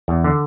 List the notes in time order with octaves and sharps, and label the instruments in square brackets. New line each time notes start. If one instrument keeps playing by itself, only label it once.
[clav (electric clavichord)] E2
D3